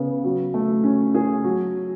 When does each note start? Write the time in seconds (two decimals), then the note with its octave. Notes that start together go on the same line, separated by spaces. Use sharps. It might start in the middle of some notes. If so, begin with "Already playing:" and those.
Already playing: C#3 B3
0.24 F#3
0.54 A3
0.84 C#4
1.15 G#4
1.44 F#3